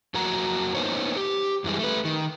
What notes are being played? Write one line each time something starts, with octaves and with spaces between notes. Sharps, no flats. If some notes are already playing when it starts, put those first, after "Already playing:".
F2 F#3 A#3 F#4 A#5
A#3 B3 D#4 C5 C#5
G4
F#2 E3 G3 G#3
A3 B4
D#3